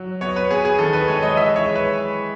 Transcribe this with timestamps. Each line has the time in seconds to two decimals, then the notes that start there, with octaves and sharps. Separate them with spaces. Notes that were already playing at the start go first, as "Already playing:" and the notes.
Already playing: F#3
0.21 B3 C#5
0.36 B4
0.50 B3 G#4
0.65 G#4
0.79 D#3 A4
0.93 B4
1.08 G#3 C#5
1.23 D#5
1.37 E3 E5
1.56 C#5
1.66 G#3
1.75 B4